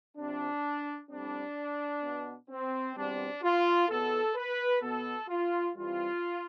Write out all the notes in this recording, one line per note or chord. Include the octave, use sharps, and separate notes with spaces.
C3 F3 C4 D4
A2 G3 C4 D4
B2 B3
C4
E2 B2 G3 C4 D4
F4
E2 B2 B3 A4
B4
B2 B3 A4
F4
G2 E3 G3 C4 F4